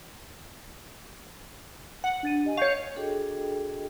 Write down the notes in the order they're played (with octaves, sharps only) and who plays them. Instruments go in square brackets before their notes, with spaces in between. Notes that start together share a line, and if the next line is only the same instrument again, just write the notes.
[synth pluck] F#5
[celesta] D4 A6 D#7
G4 D#5 G#5
[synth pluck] C#5 F5 [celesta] C#6 G6 C7
[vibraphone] D4 F#4 G#4 A4 D#5 G5